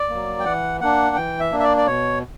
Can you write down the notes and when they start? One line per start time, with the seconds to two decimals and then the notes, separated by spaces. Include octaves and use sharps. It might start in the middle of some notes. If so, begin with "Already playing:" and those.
Already playing: D5
0.09 F#3 A#3
0.40 G5
0.45 E3 F#5
0.81 A#3 D4 F#5
1.16 E3 G5
1.40 E5
1.52 A#3 D4
1.60 E5
1.63 D5
1.77 D5
1.87 B2 C#5